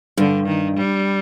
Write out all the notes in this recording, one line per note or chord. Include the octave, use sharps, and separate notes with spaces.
G2 D3
D#3
G3